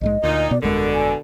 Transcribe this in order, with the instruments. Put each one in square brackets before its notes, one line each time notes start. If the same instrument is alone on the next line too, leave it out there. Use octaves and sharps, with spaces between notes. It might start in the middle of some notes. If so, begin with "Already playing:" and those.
[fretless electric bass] A#1 G#2 G#3 [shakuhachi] D#5
[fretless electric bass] D2 [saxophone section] A#2 D#4
[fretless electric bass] B2 B3 [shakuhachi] D5
[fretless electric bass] G1 F2 G#3 [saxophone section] B2 D3 [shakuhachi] A#4
[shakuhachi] G#5